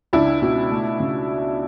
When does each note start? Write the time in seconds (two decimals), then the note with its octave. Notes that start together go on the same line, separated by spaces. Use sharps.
0.13 C#2 D4 E4
0.42 B2
0.71 A3
1.00 C#3